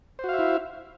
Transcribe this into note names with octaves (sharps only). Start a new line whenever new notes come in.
E4 F#4 C5 E5 F5